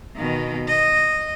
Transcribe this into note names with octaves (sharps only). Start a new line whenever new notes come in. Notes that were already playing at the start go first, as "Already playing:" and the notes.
B2 D#3
D#5